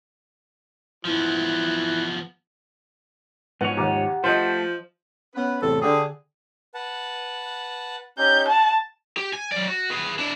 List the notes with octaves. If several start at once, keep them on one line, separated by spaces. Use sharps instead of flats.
E3 F3 B3
G#2 F3 B3 C#5 F#5 G#5
D#2 G4 F#5 D6
F3 A3 C5 D#5
B3 C#4 B4
E2 A2 C3 A4
D3 G4 G#4
B4 F#5 A5
C#4 D#4 G4 G6
F#5 A5
G4
G#5
F#3 D5
F#4
G#4 B4
D4 E4